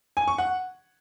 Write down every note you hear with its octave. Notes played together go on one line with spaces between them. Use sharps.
G#5
C#6
F#5